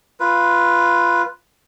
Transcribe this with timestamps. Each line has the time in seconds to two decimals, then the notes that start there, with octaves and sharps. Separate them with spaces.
0.20 F4 B4